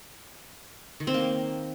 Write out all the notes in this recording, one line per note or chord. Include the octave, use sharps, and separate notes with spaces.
D#3
C4
A#3